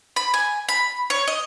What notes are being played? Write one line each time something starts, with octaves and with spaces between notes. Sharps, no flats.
B5
G#5
B5
C#5
D#5